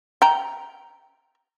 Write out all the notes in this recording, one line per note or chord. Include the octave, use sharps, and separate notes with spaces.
G5 A#5